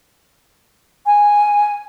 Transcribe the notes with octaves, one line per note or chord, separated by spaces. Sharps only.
G#5